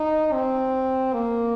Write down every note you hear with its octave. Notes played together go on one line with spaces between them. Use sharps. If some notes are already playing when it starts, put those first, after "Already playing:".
Already playing: D#4
C4
A#3